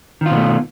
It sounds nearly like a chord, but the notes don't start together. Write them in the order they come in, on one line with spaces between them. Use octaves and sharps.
D#3 F4 B2 A3